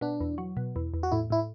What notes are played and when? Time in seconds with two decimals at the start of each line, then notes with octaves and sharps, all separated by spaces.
0.01 B2 D4
0.20 E2
0.38 F#3
0.57 B2
0.76 E2
0.94 E2
1.03 F#4
1.12 A2 E4
1.30 A2 E4